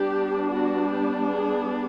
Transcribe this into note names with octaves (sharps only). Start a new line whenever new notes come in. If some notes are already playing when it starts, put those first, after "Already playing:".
Already playing: G3 B3 D4 G4
F#4
G4
G#4